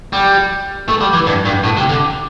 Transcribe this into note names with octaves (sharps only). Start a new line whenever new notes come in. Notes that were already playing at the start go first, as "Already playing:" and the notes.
G3
A3
G3
E3
G2
G2
A2
C3
D3